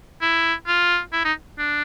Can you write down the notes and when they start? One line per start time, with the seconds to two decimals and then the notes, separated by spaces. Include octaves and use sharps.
0.22 E4
0.67 F4
1.13 E4
1.25 D#4
1.59 D4